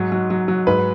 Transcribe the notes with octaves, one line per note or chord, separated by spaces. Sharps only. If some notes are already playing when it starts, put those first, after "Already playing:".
Already playing: G#2 F#3
F#3
F#3
F#3
G#2 B4